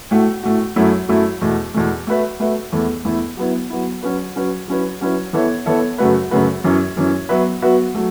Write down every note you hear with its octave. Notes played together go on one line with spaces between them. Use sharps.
A2 A3 F#4
A2 A3 F#4
F#2 F#3 A3 E4
F#2 F#3 A3 E4
E2 B2 A3
E2 B2 A3
A3 F#4 B4 E5
A3 F#4 B4 E5
E2 E3 A3 E4 A4
E2 E3 A3 E4 A4
F#3 B3 E4
F#3 B3 E4
F#3 C#4 F#4 B4
F#3 C#4 F#4 B4
F#3 C#4 E4 B4
F#3 C#4 E4 B4
E3 B3 A4 C#5 E5
E3 B3 A4 C#5 E5
F#2 C#3 A3 F#4 B4
F#2 C#3 A3 F#4 B4
F#2 E3 C#4
F#2 E3 C#4
F#3 B3 F#4 B4 E5
F#3 B3 F#4 B4 E5
F#3 A3